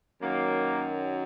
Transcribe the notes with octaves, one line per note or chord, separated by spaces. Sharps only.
F#2 D#3 F#3 A#3